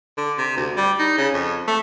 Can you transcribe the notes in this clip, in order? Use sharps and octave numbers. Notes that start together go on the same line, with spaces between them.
D3
C3
D2
G3
D#4
C#3
F2
A3